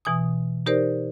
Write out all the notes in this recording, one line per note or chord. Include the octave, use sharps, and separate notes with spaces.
B2 E3 G#5 D#6
D#4 G4 A#4 C5 D5